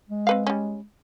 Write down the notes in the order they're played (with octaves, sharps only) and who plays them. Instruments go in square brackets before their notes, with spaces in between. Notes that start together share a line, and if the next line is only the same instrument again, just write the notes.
[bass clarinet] G#3
[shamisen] C4 B4 F5
G3 C#4